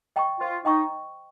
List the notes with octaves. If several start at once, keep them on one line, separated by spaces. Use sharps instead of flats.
D#5 G5 A#5 C#6
F4 C5
D#4 D#5 G5 A#5 C#6